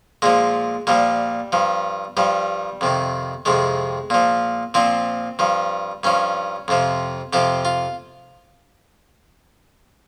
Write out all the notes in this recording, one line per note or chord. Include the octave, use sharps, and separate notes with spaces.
A#2 F3 G#3
A#2 F3 G3
G2 F3
G2 F3 G3
F2 C3 D#3
F2 C3 D#3 G#3
A#2 F3
A#2 F3 C4
G2 F3
G2 F3 C#4
F2 C3 F3
F2 C3 F3 G4
F4